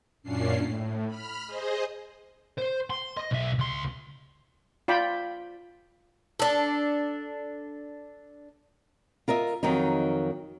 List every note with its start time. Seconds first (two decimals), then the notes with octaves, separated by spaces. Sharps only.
0.23 F#2 A#2 C#4 D4 C7
0.62 A2
1.06 B5 F6
1.47 G#4 C5 D#5
2.58 C5
2.90 C6
3.17 D#5
3.31 B1 E5
3.59 C#2 C6
4.88 F4 D5 G5 B5
6.39 D4 A4
9.28 F4 A#4 D#5 E5
9.63 F2 D#3 F#3 D#4